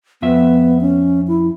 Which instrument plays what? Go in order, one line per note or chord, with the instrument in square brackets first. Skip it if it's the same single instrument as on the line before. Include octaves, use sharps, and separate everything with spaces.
[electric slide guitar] F2 F3 E5 [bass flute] B3
[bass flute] C#4
E4